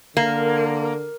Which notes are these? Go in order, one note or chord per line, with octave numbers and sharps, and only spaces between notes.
D3 A#3 A#4